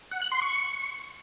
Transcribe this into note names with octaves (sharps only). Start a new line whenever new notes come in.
F#5
F#6
C6
C#6